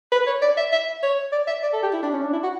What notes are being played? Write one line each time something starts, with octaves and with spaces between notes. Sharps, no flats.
B4
C#5
D5
E5
E5
C#5
D5
E5
D5
A4
G4
E4
D4
C#4
D4
E4
F#4